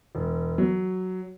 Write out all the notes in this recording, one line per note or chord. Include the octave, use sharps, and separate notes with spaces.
E1
F#3